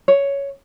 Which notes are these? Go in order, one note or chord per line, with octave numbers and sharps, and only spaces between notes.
C#5